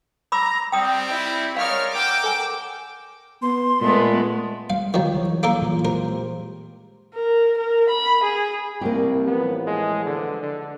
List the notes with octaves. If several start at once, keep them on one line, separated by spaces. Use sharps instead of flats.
A#5 B5 D6 E6
G3 C4 G5 D#6
E4
G#3 A#4 C#5 D5 F5 D#6 F6
A#4 F#5 G5 D6 E6
A4 G#5
B3 C6
A#2 G#3 A3 B3
G3 G#3 F5
D#3 F3
E3 F#3 C#5
A#3 A4 A#4
A#2 E3 F4
G#3 G4 A#4 C5
A#4
A#4
B5
G#4
C2 G3 A#3 C4 G4
A2 E3 F3 B3
G#3
D3
D3